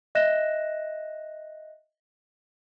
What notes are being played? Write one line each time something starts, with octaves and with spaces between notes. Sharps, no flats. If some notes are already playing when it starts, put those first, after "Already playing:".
D#5 E5 F#6 A#6 E7